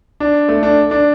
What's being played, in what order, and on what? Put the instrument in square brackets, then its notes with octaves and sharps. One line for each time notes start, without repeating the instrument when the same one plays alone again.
[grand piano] D4
A3
D4
D4